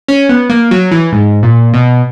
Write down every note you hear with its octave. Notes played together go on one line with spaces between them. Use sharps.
C#4
B3
A#3
F#3
E3
G#2
A#2
B2